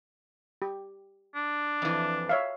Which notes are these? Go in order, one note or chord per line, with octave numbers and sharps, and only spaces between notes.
G4
D4
F2 E3
C#5 E5 F5